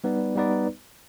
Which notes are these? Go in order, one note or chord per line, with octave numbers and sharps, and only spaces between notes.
G3 B3 D#4 B4 D5
G3 B3 D#4 B4 D5